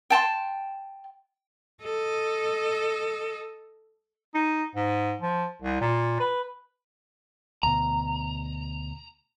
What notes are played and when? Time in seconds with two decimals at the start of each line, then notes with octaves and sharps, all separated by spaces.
0.10 G5 A5 C6
1.82 A4 D#5
4.34 D#4
4.75 G#2
5.21 F3
5.62 C2
5.81 A#2
6.20 B4
7.63 D2 B2 A#5